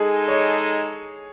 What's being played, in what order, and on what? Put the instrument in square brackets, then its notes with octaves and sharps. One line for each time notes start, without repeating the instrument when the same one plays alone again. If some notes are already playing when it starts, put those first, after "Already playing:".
Already playing: [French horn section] G#3 D#4 A4 [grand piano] G#4
[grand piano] C#5